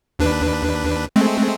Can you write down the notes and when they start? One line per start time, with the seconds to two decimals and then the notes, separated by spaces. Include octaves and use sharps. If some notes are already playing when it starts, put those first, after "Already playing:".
0.19 D#2 D4 B4
1.16 G#3 A3 C4